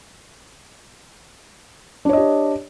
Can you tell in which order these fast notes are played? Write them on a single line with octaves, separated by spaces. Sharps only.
D4 C#5 D#5 G4